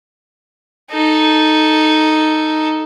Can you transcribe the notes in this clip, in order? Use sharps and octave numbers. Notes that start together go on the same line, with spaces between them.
D#4 A4